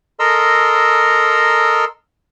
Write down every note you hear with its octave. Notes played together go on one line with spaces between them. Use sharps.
A4 A#4 D#5 A#5 C6 E6